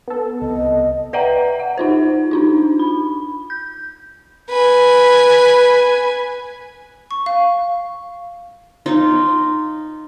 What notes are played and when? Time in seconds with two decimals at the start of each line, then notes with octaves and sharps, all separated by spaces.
0.08 B3 A4
0.41 C2 D#5
1.13 B4 D5 E5 F#5 G5 A#5
1.60 F#5
1.78 D#4 F4 C5
2.31 D4 D#4 F4
2.79 B5
3.50 G6
4.49 B4 G#5
7.11 C#6
7.26 F5
8.86 D#4 F4